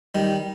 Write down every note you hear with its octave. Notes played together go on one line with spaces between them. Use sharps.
D#3 G3